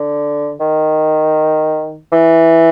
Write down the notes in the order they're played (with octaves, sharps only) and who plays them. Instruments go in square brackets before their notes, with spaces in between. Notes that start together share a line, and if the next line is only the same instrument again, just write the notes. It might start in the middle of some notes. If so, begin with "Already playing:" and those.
Already playing: [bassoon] D3
D#3
E3